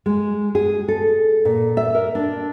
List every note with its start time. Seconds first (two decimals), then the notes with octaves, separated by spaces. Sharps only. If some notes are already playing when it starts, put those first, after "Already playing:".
0.06 G#3
0.55 G#4
0.88 A4
1.45 A#2
1.77 E5
1.95 A#4
2.15 D4